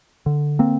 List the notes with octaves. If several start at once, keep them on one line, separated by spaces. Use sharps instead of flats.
D3
A#3 C4